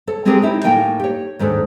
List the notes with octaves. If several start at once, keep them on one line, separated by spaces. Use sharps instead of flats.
A4 C#5
G#3 C4 D4 G4 G#4 A#4
D#4 E4 G4 C#5
A2 A3 A#3 G5 G#5
G4 C#5
D#2 G#2 D4 A4